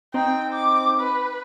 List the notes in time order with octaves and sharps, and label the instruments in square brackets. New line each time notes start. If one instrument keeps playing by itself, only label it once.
[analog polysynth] C4 D#4 [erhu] G5
[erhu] D6
B4